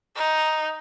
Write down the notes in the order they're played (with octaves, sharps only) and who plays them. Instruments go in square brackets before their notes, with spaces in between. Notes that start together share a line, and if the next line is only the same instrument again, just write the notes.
[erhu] D#4